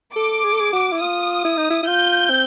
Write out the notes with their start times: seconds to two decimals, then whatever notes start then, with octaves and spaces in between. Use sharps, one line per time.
0.15 A4 D6
0.44 G#4
0.52 A4
0.60 G#4
0.73 F#4
0.92 E4
1.02 F4 D#6
1.45 E4
1.57 D#4
1.70 E4
1.83 E4
1.87 F4 G6
2.30 C4